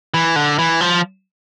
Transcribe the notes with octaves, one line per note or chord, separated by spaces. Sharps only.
E3
D3
E3
F3